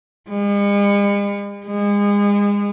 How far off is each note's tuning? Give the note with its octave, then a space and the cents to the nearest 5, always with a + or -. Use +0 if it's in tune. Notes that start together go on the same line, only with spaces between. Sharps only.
G#3 -45
G#3 -30